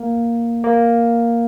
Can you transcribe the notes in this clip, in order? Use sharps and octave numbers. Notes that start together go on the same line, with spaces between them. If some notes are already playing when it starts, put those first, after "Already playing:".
Already playing: A#3
A#3